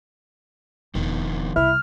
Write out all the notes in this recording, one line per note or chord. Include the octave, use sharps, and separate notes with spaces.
E1 F2 D#3
C2 E4 F6